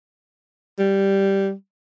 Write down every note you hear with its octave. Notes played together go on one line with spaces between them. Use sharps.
G3